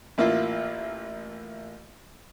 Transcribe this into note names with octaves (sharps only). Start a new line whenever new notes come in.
A1 A#3 E4 F4